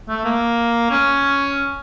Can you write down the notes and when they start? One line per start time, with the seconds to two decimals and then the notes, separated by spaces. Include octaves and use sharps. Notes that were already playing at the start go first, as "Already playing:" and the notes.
0.08 A3
0.25 A#3
0.90 C#4